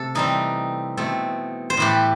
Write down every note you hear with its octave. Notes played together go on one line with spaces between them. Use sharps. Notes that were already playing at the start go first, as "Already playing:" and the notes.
Already playing: C3 A3 A4
E3 G3 C4 D#4
B2 A3 C4
C5
A2 E3 A3 G4 B4